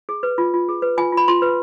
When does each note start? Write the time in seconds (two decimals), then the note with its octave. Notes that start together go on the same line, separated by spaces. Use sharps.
0.09 G#4
0.23 B4
0.38 F4
0.54 F4
0.69 G#4
0.82 B4
0.97 F4 G#5
1.12 F4
1.17 B5
1.28 F4 C6
1.42 B4